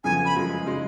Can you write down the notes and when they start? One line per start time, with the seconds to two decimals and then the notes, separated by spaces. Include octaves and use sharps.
0.04 F2 C#3 F3 B3 G#5
0.25 B5
0.36 F#2 F3 G#3
0.66 C#3 G#3 D#4